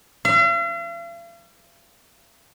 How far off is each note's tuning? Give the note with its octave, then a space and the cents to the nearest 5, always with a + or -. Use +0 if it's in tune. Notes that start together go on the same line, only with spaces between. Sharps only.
F5 -45